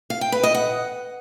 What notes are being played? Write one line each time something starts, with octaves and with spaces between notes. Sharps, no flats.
F5
G5
B4
D#5
F#5